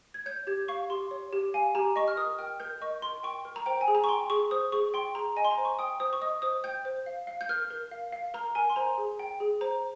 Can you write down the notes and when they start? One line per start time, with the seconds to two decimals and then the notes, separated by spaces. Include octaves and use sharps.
0.14 G#6
0.26 C#5 G6
0.47 G4 G#6
0.68 F5 C#6
0.90 G4 C6
1.11 C#5
1.33 G4
1.54 F5 G#5
1.75 G4 A#5
1.96 D#5 C#6
2.08 F6
2.17 A#4 D#6
2.39 G5 F6
2.60 A#4 G6
2.81 D#5 C#6
3.02 A#4 C6
3.23 G5 C#6
3.45 A#4
3.56 A#5
3.66 C5 G5
3.81 G#5
3.88 G#4
3.95 A#5
4.04 C#6
4.09 G5 C6
4.30 G#4 C#6
4.51 C5 D#6
4.72 G#4 C#6
4.94 G5 C6
5.15 G#4 A#5
5.36 D#5 G#5
5.45 C6
5.51 A#5
5.58 C5
5.65 C#6
5.79 G5 D#6
6.00 C5 D#6
6.13 C#6
6.21 D#5 D#6
6.42 C5 D#6
6.64 G5 G6
6.85 C5
7.06 F5
7.27 F5
7.41 G6
7.49 A#4 F6
7.71 A#4
7.91 F5
8.12 F5
8.34 A#4 A#5
8.55 A#4 G#5
8.70 C6
8.76 C5 A#5
8.98 G#4
9.19 G5
9.40 G#4
9.61 C5 A#5